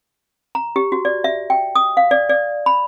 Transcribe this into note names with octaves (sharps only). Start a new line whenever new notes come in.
A#5
G4
F#4
D5
E5
G5
D#6
F5
D5
D5
B5